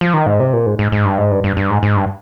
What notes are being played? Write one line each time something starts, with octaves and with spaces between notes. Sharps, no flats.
F3
D#3
G#2
C3
A#2
G#2
G#2
G#2
G2
G#2
G2
G2
G2
G#2
G#2
G2